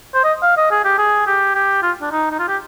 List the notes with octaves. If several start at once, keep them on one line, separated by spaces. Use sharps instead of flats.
C5
D#5
F5
D#5
G#4
G4
G#4
G4
G4
F4
D4
D#4
D#4
F4
G4